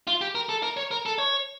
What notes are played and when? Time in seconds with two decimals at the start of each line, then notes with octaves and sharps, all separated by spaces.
0.07 F4
0.21 G4
0.35 A#4
0.49 A4
0.63 A#4
0.77 C#5
0.91 A#4
1.06 A4
1.18 C#5